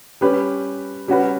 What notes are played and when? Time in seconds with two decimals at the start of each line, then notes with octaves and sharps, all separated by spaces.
0.21 G3 C#4 G4 B4
1.08 G3 C#4 F#4 B4